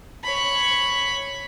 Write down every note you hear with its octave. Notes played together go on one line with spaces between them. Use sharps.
C#5 B5